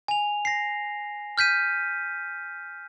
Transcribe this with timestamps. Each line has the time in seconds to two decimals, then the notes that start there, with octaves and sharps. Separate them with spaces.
0.08 G#5 F7
0.45 A#6 C7
1.38 F6 G6 B6 D#7